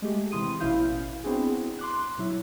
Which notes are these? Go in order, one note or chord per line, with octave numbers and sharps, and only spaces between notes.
G#3 A3 G4
C3 E3 E4 C6 D#6 D#7
A1 B2 C#4 E4 F5 G6
B3 C4 D4 E4 F#4 G#4
C6 D6 F#6
B2 F#3 E4